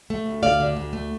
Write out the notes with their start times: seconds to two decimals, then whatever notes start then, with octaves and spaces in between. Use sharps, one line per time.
0.10 A3
0.26 D2
0.43 D2 D5 F5
0.60 D3
0.77 D2
0.93 A3